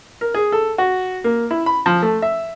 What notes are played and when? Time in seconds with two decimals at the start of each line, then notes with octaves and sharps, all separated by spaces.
0.21 A#4
0.34 G#4
0.52 A4
0.78 F#4
1.24 A#3
1.51 E4
1.66 B5
1.86 F3
2.02 A3
2.22 E5